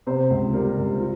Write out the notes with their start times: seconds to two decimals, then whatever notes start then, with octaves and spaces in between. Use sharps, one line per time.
0.07 C3 C5
0.30 C#2
0.54 G3 A#4
0.77 C#2
1.00 F4